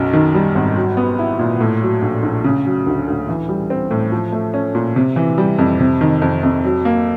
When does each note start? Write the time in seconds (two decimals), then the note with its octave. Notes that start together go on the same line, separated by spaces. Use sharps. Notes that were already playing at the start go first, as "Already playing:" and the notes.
Already playing: B1 F#2
0.13 D#3
0.34 G3
0.55 G#1
0.76 F#3
0.97 B3
1.19 E4
1.39 A#2
1.61 A2
1.82 F#3
2.02 A#1
2.23 A#1
2.44 C#3
2.65 F#3
2.87 D2
3.07 D2
3.29 E3
3.49 G3
3.70 C4
3.91 A2
4.12 F3
4.32 A3
4.54 C#4
4.75 A#2
4.96 C3
5.16 E3
5.38 G3
5.59 F2
5.80 C3
6.01 D#3
6.22 F2
6.43 F2
6.64 F#3
6.85 A#3